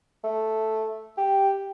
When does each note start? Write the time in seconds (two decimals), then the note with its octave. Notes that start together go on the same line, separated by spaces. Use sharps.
0.24 A3
1.18 G4